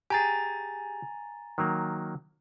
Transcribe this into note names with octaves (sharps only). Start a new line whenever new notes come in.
G4 G#4 G#5 A#5 A6
D#3 F#3 A#3